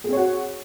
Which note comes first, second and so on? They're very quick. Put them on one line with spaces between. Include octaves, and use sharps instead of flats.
G#4 C4 C#5 F#4